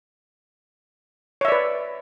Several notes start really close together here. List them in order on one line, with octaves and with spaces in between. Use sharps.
C#5 E5 D5 B4